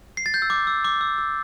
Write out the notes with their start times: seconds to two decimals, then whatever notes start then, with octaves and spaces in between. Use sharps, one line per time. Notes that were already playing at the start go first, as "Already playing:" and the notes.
0.17 C7
0.26 A6
0.34 G6
0.42 E6
0.50 D6
0.67 E6
0.85 D6
1.01 E6
1.18 E6